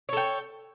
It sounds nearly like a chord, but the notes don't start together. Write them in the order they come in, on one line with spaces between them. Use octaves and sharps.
C#5 A4 G5